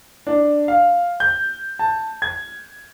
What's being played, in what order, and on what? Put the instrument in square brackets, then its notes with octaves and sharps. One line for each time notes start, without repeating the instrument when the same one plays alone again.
[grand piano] D4
F5
G6
A5
G#6